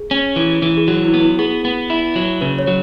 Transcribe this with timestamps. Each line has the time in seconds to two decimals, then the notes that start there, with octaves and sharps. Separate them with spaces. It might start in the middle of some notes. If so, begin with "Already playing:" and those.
Already playing: G#4
0.11 C#4
0.36 E3
0.62 E3
0.77 G#4
0.88 F#3 F#4
1.04 E4
1.14 B3
1.21 E4
1.39 B3 G#4
1.65 B3
1.90 E4
2.16 F#3
2.41 C#3 B4
2.59 C#5
2.67 F#3